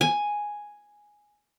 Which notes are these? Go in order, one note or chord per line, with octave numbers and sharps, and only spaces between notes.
G#5